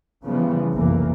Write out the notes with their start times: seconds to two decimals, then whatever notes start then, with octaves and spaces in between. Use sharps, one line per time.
0.24 C#3 E3 F3 G3 B3
0.72 F1 B1 E2 E3 A#3